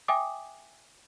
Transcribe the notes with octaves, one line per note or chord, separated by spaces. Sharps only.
E5 G5 G#5 D6 D#6